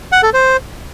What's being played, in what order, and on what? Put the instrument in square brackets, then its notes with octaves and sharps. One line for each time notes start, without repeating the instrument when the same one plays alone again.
[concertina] F#5
A4
C5